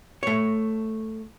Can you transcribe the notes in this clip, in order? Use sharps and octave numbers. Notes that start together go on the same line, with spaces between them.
A3 C#5